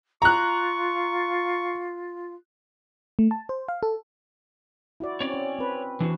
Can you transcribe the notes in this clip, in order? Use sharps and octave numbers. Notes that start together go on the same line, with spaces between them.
F4 A#5 C#6 F#6
A3
A5
C5
F5
A4
E4 F#4 D5
C4 C#4 C#5 D5
C#4
C4 B4
E3 D4 F#4